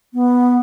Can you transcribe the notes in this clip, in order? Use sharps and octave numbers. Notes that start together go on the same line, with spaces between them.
B3